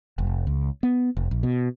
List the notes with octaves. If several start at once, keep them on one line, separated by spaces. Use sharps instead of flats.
F1
C#2
B3
F1
A#1
B2